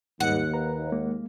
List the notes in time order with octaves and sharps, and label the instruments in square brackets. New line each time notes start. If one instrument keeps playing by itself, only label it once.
[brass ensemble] D#2 [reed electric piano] G#2 G3 D#5 [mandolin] F#5
[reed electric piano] B4 A#5
G#3 A#3